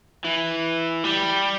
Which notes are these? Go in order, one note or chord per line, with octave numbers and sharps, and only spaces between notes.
E3
G3